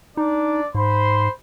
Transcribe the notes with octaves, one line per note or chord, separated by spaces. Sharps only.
D4 D#4 D5
G#2 C5 B5 C6